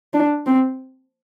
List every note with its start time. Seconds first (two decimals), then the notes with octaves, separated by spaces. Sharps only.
0.14 D4
0.46 C4